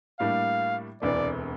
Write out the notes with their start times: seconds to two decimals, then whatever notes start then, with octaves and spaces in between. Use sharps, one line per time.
0.20 A2 G3 A#3 D4 F5
1.02 E1 D2 C3 E3 A3 D5